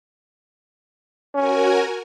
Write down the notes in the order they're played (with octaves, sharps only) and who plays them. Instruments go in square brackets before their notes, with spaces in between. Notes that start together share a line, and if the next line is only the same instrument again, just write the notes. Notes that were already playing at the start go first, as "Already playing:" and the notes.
[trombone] C#4 [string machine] F#4 A#4 G#5